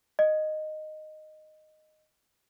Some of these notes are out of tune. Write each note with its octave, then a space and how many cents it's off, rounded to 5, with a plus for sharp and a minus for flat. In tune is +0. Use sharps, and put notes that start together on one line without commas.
D#5 -10